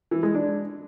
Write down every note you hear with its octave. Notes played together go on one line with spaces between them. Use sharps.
E3
G#3
D4